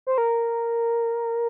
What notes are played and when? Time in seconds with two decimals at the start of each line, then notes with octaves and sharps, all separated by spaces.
0.07 C5
0.18 A#4